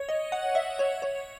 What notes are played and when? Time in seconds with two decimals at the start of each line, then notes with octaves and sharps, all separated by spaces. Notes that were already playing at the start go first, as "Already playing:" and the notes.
Already playing: C#5
0.09 D#5
0.32 F#5
0.55 E5
0.79 C#5
1.02 C#5